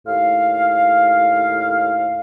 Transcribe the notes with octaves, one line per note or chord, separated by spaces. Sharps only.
D#2 A2 F5